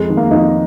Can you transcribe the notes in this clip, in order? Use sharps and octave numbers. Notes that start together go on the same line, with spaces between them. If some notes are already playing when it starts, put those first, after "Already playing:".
Already playing: F2 G#3
D#3
A#3
F2 D#4